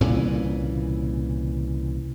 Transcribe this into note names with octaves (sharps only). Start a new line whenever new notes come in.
C2 A#2 C#3 E3